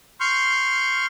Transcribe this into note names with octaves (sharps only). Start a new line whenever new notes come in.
C6 C#6 F6 G6